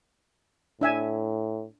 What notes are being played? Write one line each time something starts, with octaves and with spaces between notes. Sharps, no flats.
A2 D4 E5 G#5